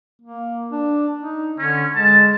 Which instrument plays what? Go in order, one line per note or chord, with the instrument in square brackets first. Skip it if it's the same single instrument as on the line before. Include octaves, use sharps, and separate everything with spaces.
[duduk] A#3
D4
D#4
[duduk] D3 [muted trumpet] C#4
[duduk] G#3 [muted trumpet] A5